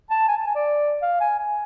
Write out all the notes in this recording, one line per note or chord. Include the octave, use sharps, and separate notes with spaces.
A5
G#5
A5
G#5
D5
F5
G#5
G#5